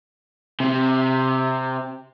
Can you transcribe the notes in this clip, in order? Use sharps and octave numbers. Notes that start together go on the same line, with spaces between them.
C3 C4